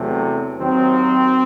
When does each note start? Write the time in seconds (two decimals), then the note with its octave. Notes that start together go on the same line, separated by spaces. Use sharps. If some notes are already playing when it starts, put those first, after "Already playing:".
Already playing: E2 C3 F#3 A3
0.58 D#2 D#3 F#3 C4